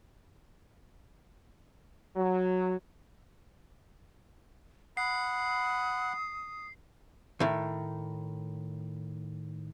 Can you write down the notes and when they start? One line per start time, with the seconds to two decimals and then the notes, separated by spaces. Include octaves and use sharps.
2.16 F#3
4.97 F#5 B5 D#6 C7
7.40 A2 D#3